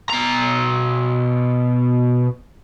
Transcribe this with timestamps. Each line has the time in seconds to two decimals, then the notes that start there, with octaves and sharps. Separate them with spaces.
0.10 B2 A#5